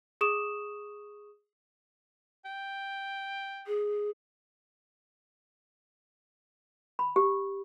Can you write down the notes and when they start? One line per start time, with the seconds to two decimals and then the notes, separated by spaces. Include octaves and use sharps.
0.21 G#4 C#6 D#6 E7
2.45 G5
3.67 G#4
6.99 B5
7.16 G4